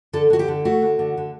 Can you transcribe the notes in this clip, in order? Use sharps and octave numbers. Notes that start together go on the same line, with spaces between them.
D3 A4
D3 F#4
G4
D3
A3 F#4
D3
D3
D3